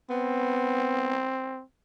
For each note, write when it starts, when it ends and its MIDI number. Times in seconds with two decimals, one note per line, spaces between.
0.10 1.17 59
0.10 1.63 60